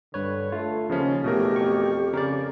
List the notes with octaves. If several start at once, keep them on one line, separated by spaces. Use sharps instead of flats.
G2 D3 B4 C#5
A3 F4
D#2 C#3 F3 C#4
E2 B2 A3 G4 A#4
F2 C#6
C#3 A#4 D5